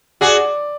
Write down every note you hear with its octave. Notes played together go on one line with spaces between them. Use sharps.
F#4 G#4 D5